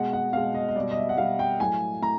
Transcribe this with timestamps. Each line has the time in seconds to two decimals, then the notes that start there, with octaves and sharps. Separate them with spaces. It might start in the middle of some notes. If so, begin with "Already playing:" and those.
Already playing: B2 G#3 F#5
0.13 F#5
0.33 B2 G#3 F5
0.54 D#5
0.68 D#5
0.76 B2 G3 D5
0.91 D#5
0.97 E5
1.09 F#5
1.17 B2 G3 F5
1.39 G5
1.60 A2 F#3 G#5
2.02 A2 A#5